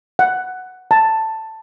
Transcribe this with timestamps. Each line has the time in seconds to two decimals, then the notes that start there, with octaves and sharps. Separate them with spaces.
0.19 F#5
0.91 A5